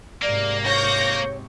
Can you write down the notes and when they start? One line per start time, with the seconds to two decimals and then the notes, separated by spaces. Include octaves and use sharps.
0.22 G#2 C3 A#3 D5
0.65 C#5 C#6 G6 A#6